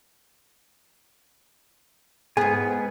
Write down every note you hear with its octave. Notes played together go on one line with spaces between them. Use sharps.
G#2 B3 G#4 G#5